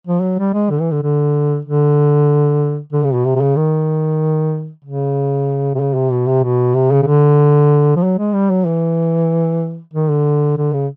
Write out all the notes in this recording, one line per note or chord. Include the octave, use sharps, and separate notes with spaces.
F3
F#3
G3
G#3
D3
E3
D3
D3
D3
D3
C#3
B2
C3
C3
C#3
D#3
C#3
C3
C#3
C3
B2
C3
B2
C3
C#3
C#3
D3
F3
F#3
G#3
G3
F#3
E3
D#3
D3
D3
C#3